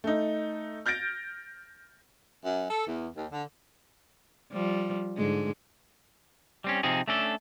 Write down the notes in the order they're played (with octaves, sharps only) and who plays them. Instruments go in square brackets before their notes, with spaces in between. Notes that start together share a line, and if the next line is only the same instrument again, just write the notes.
[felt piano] A3 D#4
F6 G6 A6 A#6 D7
[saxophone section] F#2
A4
E2
D#2
D3
[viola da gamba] F3 G3
G#2 D3 G#3
[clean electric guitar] G3 C4 C#4
C3 F3 C4 D#4 G#4
A3 C#4 D4 A4